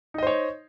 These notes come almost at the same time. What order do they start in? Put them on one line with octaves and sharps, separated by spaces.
D#4 D#5 C5 C#5